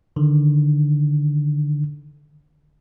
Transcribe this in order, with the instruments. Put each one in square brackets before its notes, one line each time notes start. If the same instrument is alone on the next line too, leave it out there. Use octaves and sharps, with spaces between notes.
[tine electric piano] D3 D#3